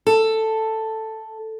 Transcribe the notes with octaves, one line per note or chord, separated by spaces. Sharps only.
A4